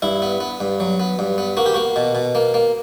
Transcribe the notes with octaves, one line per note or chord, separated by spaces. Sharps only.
G2 E4
B3
B3
G2
F#3
B3
G2
B3
A#3 F#4
G4
A#3 F#4
B2
B2
A#3
A#3